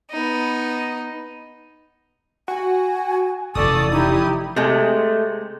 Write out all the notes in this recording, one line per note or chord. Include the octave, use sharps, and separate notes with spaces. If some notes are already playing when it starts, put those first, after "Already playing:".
B3 D#4
F#4 G#5
F1 C#3 E3 A4 D5 C#6 D#6
D#4 E4 G4
C3 G#3 A3